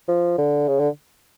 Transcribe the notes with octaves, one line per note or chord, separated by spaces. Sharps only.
F3
D3
C#3
D3